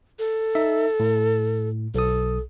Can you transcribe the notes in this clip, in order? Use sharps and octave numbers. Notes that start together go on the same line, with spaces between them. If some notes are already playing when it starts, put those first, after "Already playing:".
A4
D#4 E5
A2
B1 A4 D#6